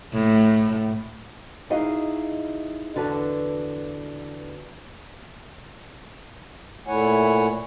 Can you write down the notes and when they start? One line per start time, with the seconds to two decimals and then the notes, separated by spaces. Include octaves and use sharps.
0.13 A2
1.70 D#4 E4 F#4 G#4 D#5 F5
2.95 E2 D3 F#4 B4 A5
6.87 A#2 A3 E4 C#5 F#5 G#5